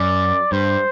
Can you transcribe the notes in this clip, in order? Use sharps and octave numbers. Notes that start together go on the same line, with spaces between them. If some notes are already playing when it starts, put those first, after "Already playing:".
Already playing: F#2 D5
G2 C5